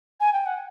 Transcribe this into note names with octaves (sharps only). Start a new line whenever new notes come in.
G#5
G5
F#5